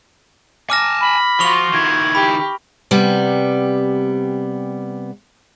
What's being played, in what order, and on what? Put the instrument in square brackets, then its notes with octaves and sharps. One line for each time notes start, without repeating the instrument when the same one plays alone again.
[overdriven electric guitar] G#5 A5 [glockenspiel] D6 F6 A#6
[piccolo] B5
[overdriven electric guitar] F3 [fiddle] F4 F#4 [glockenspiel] C#6 F7
[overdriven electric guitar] D#3 E4 [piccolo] G#6
[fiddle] G4 [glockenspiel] B5
[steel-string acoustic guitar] C3 G3 B3